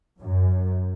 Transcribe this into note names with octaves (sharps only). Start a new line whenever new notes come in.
F#2